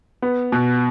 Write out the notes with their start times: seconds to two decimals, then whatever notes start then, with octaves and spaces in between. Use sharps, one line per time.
0.22 B3
0.52 B2